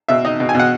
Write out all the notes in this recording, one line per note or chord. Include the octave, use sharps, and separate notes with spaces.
B2 E5
D#4 D#5
B2
G#5
B2 F#5